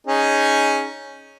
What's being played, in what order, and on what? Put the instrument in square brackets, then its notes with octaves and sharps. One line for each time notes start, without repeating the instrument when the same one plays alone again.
[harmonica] C#4 D#4 G#4